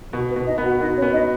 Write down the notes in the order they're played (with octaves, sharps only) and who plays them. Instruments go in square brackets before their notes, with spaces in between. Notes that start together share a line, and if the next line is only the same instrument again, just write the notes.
[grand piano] B2 [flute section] F#4
[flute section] B4
[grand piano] B2
[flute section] D#4 D#5
[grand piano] B3
[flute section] F#4 F#5
[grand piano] B3 [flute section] D#4 D#5
[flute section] C#4 C#5
[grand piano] B3
[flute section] D#4 D#5